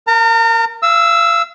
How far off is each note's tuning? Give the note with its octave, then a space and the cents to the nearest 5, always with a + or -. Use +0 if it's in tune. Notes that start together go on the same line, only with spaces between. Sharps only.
A#4 +0 A#5 -40
F5 -35 E6 -5